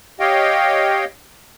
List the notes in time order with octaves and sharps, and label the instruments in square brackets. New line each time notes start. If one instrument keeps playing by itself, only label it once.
[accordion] G4 C#5 D#5 F5 G5